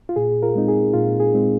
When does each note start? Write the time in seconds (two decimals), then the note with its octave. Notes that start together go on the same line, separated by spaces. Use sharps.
0.09 F4
0.16 A#2 G#4
0.43 F4 A#4
0.55 G#3 C4 D#4
0.68 G#4
0.94 A#2 F4
1.20 G#4
1.34 G#3 C4 D#4